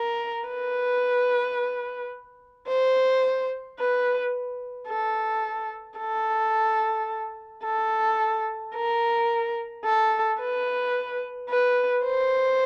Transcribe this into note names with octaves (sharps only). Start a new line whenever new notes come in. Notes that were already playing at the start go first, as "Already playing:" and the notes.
Already playing: A#4
B4
C5
B4
A4
A4
A4
A#4
A4
B4
B4
C5